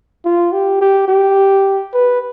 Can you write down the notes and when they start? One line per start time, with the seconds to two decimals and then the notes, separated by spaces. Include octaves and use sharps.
0.25 F4
0.52 G4
0.81 G4
1.08 G4
1.94 B4